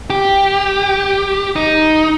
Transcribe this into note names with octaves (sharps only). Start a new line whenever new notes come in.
G4
D#4